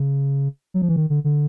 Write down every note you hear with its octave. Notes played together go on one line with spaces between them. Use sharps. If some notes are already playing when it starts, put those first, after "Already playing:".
Already playing: C#3
F#3
F3
E3
D#3
D3
D3